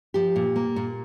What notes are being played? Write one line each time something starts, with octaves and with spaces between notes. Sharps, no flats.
F3 G4
A#2
A#3
A#2